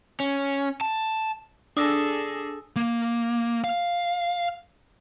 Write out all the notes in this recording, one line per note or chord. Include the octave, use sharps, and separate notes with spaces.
C#4
A5
D4 G#4 A4 D#6 E6 A#6
A#3
F5